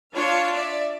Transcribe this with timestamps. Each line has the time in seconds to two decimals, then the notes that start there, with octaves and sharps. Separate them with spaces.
0.13 D4 F4 C#5 F5
0.53 D5 E5